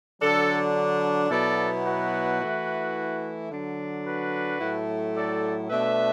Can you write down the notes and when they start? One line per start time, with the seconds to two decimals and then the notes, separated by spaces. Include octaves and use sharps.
0.21 D3 F#3 D4 A4
1.31 B2 F#3 B3 E4 A4 D5
1.85 F#4 B4
2.40 E3 A3 E4
3.50 D3 F#3 D4
4.05 F#4 B4
4.60 A2 F#3 A3 E4
5.15 A4 D5
5.70 B2 A3 D4 B4 E5